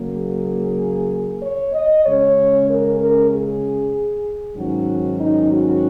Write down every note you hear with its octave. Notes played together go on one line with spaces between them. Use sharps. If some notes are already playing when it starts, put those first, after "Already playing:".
Already playing: C#3 F#3 A#3
G#4
C#5
D#5
C#3 G#3 C#4 C#5
A#4
A#4
G#4
G#2 D#3 F#3 C#4 F#4
D#4
F#4